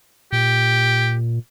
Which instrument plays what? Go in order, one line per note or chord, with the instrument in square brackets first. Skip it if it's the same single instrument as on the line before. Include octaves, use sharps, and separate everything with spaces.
[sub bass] A#2 [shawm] G4